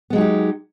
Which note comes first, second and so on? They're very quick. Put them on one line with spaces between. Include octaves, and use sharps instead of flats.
B3 G#3 F#3 D#4 G4